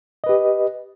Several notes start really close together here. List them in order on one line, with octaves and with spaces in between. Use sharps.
D#5 B4 G4